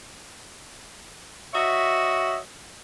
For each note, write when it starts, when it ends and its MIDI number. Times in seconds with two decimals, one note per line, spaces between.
1.54 2.38 66
1.54 2.38 73
1.54 2.38 75
1.54 2.38 76